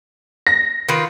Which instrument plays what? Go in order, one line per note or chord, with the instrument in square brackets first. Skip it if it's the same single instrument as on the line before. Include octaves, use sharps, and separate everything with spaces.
[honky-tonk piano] A#6
[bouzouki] D#3 F4 B4